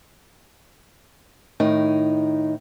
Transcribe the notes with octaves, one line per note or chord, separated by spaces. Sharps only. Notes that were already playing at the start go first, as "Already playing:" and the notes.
A2 D#3 D#4